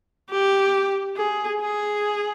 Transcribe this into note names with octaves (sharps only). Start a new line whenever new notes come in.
G4
G#4
G#4